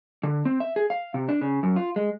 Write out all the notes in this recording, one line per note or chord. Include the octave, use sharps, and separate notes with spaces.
D3
C4
E5
G#4
F5
C3
D4
C#3
F#2
F4
G#3